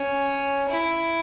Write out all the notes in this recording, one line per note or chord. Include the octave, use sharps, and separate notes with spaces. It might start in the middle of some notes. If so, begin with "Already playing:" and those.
Already playing: C#4
E4